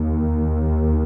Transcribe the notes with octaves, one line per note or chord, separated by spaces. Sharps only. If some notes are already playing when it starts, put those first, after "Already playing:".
Already playing: D#2